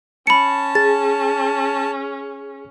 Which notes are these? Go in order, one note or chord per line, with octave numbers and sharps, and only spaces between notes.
C#4 A5 B5 C#7
G#4 A6